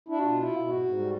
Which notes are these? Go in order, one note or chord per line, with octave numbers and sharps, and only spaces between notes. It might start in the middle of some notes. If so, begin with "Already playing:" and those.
D4 E4
F#4
B2 F4
E4
B2
G#2 F#4
G#2
G3